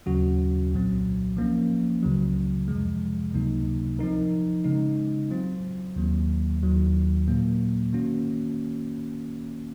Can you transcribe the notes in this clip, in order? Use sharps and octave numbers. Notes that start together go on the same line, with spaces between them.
D#2 C#3 F#3 C#4 F#4
C2 A#2 F#3 C4
F3 A#3 C#4
C#2 C#3 F#3
F2 C3 F3 G#3
C#2 C3 F#3 A#3 D#4
F3 C4 D#4 A#4
C#3 G#3 D#4
F#3 C4 F4 C5
D#2 D#3 F#3 A#3
D#2 D#3 F#3
A#2 F#3 A#3
D#3 A#3 C#4 F#4